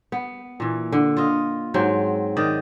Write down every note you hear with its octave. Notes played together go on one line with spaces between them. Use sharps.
B3
A#2 E3
D3
F4 D#5
G#2 F#3 C4 G5
D#3 D5 D#5